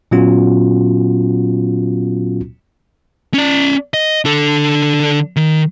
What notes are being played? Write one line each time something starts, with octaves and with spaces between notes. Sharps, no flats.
A#2 F#3 B3 C#4 F4 F#4
C#4 D5
D#5
D3 A4
D#3